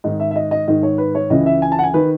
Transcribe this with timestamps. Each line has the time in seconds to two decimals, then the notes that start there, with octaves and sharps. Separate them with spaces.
0.04 G#2 D#3 D#5
0.20 E5
0.31 E5
0.36 D#5
0.51 D#5
0.68 G#2 D#3 D#5
0.83 C#5
0.98 B4
1.15 C#5
1.30 C#2 C#3 E3 D#5
1.46 E5
1.62 G#5
1.72 A5
1.79 F#5
1.83 G#5
1.94 D#3 B4